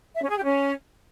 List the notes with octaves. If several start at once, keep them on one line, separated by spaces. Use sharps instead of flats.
E5
C#4
G#4
G4
C#4